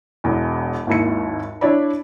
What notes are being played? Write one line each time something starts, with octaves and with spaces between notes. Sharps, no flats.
E1 E2
G#1 D#2 E4 C#7
D4 E4 C#5 D5 B5